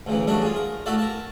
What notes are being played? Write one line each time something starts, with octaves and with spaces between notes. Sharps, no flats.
D2 C#3 E3
F#3 G3 A3 D4 F#4
F4 G#4
A#4
A3 E4 F#4 A4 D5 F5
A#4 A5